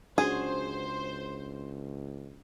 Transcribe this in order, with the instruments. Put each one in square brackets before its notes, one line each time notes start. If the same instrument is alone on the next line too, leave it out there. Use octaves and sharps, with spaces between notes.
[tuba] C#2 [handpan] C#4 D4 F#4 [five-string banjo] G#4 [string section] C5